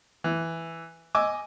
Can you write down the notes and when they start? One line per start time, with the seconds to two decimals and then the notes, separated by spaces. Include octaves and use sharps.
0.24 E3
1.15 D#5 G#5 D6 E6